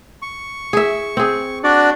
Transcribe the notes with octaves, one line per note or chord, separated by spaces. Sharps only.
C#6
G#4 E5
C4 G#4
D4 F#4 D5